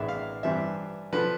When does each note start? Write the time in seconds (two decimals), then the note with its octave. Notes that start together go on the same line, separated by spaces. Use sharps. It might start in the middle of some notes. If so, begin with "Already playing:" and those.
Already playing: A1 G#2 D#3 G#3 B3 D5 E5
0.08 F5
0.43 G2 E3 G3 C4 E5
1.13 D3 F3 B4